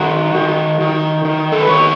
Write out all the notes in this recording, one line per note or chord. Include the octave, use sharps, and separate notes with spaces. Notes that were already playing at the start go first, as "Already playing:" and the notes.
Already playing: D#3 F#4
D#3
D#3
D#3
A4
B4
D#3 C#5